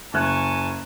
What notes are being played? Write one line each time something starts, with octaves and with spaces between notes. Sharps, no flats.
F#1 G#5 A5 C#6 F#6